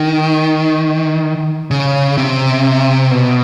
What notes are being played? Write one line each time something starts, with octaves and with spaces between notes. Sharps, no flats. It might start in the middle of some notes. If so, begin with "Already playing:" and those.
Already playing: D#3
C#3
C3
B2